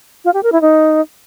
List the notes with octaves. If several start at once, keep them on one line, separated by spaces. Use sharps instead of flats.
F4
G4
A#4
E4
D#4